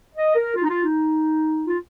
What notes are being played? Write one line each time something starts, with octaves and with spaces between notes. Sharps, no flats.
D#5
A#4
F4
D#4
F4
D#4
F4